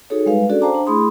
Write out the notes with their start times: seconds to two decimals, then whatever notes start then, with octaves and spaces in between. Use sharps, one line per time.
0.10 D#4 F#4 G#4 A4 C#5
0.26 G3 G#3 B4 F5
0.49 C#4 D4 F#4 G#4 A4 D5
0.61 C5 F5 G5 A5 A#5 D6
0.75 D4
0.86 A3 E4 G#4 B5 C6 D#6